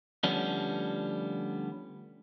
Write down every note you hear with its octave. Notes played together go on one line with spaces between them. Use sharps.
D2 D3 F3 G3 B3 C#4